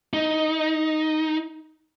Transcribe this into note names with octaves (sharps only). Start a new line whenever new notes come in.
D#4